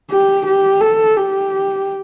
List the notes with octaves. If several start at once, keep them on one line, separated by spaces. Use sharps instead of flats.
G4
G4
A4
G4